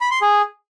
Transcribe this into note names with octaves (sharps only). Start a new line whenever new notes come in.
B5
C6
G#4